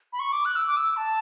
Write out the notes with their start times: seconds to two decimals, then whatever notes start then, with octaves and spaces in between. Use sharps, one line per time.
0.13 B5
0.19 C#6
0.32 D6
0.45 F#6
0.56 E6
0.67 D6
0.77 E6
0.96 A5